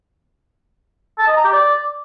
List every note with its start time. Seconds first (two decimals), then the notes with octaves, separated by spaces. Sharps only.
1.19 A5
1.27 D#5
1.36 A#5
1.44 G4
1.53 D5